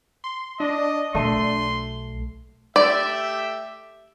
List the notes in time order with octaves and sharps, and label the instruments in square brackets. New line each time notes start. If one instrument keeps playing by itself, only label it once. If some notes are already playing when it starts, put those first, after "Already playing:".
[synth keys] C6
[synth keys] D4 [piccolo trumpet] D#5
[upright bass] B1 [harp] A3 D#7 [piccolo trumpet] C6
[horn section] A3 G4 E5 [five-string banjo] D5